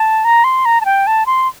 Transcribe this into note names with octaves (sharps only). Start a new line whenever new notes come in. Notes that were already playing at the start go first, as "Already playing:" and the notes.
Already playing: A5
A#5
C6
A#5
A5
G5
A5
C6